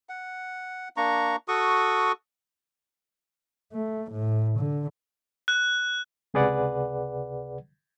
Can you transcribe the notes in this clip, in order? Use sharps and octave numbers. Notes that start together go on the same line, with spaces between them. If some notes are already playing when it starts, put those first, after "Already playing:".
F#5
A#3 D4 A#5 C#6
F#4 A4 C#6 D#6
A3
A2
D3
F#6
C#2 C3 G#4 B4 D5 F#5